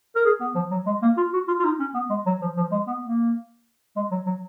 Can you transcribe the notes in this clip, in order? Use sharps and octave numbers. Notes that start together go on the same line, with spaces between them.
A#4
G#4
B3
F3
F#3
G#3
A#3
F4
F#4
F4
F4
D#4
C#4
B3
G#3
F#3
F3
F3
G#3
B3
A#3
G#3
F#3
F#3